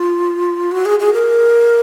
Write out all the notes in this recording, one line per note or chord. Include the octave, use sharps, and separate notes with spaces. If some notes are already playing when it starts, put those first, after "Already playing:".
Already playing: F4
F#4
G#4
G#4
A#4